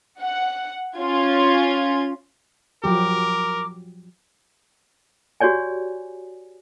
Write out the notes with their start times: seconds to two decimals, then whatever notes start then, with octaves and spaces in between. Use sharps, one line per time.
0.21 F#5
0.98 C#4 F4 G#6
2.84 F3 F#3 G4 A#4 D6
5.40 F#4 G4 C#5 D5 G#5